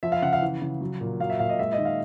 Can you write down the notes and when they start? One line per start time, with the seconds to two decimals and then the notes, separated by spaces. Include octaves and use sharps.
0.03 F3 E5
0.12 F5
0.22 C#3 F#5
0.33 F5
0.42 E3
0.61 C#3
0.81 F#3
1.01 A#2
1.20 F#3 F5
1.30 E5
1.39 A#2 F5
1.49 D#5
1.59 G#3 E5
1.73 D#5
1.78 D#3
1.85 F5